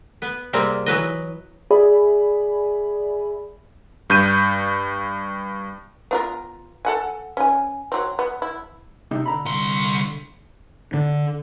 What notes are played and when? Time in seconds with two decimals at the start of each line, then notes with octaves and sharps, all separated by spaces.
0.22 B3 B4
0.53 C3 G3 G#3 A#3 C4
0.86 E3 F#3 B4 D#5
1.70 G#4 D5 E5 G#5 B5
4.10 G2 G6 D#7
6.11 B3 F4 A#4
6.85 A4 F#5 G#5
7.37 C#4 G#5
7.92 F#3 C4
8.19 B3
8.42 E4
9.11 C3 D4 D#4
9.26 D3 A#5 B5
9.45 C2 C6
10.94 D3